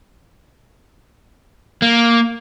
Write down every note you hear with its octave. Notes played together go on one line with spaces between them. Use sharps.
A#3